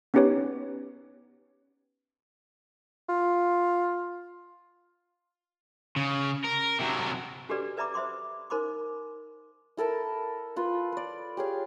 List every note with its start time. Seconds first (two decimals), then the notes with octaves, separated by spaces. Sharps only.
0.14 B3 C#4 D#4 G4 B4 C#5
3.09 F4
5.96 C#3
6.45 A#4
6.79 C3 F#3
7.49 D4 F#4 G4 A4 B4 D5
7.77 B4 D5 E5 A#5 B5 D6
7.94 C5 E5 B5 C6 D6
8.50 D#4 A#4 C5 B5 C6 D6
9.77 E4 A4 A#4 A5
10.56 F4 B4
10.92 B4 D5
11.37 G4 G#4 C#5 F5